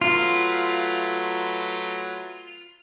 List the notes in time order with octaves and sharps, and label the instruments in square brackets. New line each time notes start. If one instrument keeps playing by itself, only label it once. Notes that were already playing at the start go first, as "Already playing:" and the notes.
[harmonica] F#3 A3 B4 [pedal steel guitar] F4